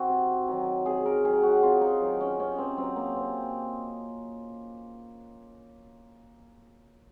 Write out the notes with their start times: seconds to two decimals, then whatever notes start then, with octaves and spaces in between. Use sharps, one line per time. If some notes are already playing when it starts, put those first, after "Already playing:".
Already playing: D#3 C4 F#4
0.09 C3
0.48 D#3 F#3
0.86 C3 G#4
1.06 A#4
1.25 D#3 F#3 G#4
1.43 F#4
1.63 C3 F4
1.81 D#4
2.01 D#3 F#3
2.21 C#4
2.40 C3 C#4
2.58 C4
2.77 F#3 C4
2.96 A#3
3.16 C3 C4